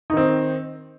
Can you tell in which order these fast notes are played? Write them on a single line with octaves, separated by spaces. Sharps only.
D#4 D#3 C4